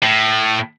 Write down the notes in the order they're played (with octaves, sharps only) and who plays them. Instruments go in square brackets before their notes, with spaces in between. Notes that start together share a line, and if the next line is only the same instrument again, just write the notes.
[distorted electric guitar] A2